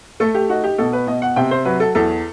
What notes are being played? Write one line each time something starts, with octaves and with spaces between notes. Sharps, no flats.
A3 A4
G4
D#4 F#4
G4
B2 A4
B4
B2 D#5
F#5
C3 G5
C5
F#3 B4
A4
E2 A4